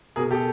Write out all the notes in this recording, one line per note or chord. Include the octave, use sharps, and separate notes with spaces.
B2 G#4 A#4
G4 A4